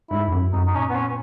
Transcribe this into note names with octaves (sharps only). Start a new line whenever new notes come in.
G#2 E4
E2
F#2
F#2 D#4
D#4
A#2 C#4
B3
C#4